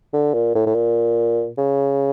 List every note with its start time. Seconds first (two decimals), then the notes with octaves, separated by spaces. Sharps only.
0.13 D3
0.34 A#2
0.55 A2
0.66 A2
0.75 A#2
1.58 C#3